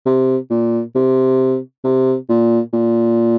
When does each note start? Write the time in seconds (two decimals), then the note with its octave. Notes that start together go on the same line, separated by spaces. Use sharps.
0.06 C3
0.50 A#2
0.95 C3
1.84 C3
2.29 A#2
2.73 A#2